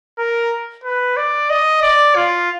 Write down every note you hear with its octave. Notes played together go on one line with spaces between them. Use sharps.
A#4
B4
D5
D#5
D5
F4